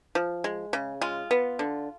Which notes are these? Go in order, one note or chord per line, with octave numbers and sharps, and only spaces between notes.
F3
G#3
C#3
G#3 F4
B3
D3